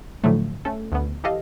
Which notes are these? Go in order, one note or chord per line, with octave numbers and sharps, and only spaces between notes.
A2 D3 F3 F#3 A3
A3 C#4 A4
D2 B3
E3 G4 A4 D#5 F5